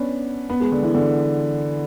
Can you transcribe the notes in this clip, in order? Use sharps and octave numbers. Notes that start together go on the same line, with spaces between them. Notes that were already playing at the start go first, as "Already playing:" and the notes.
Already playing: B3 C#4 D4
B3
G#3
D3
E3
D3